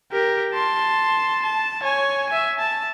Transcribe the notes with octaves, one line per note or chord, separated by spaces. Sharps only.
G4 A#4
A5 C6
A5
C#5 G#5
E5 G#5
A5